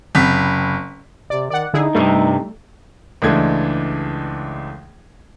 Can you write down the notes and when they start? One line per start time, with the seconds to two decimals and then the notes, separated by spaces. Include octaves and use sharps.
0.15 F#1 C3 B6
1.30 C3 D5
1.50 D#3 D5 F#5
1.74 D3 D#4 E4 G#4
1.95 G2 C3 G3 A3
3.22 C#2 E3 G#3 A3 D4 G#6